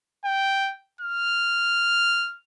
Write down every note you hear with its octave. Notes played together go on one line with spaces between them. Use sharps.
G5
F6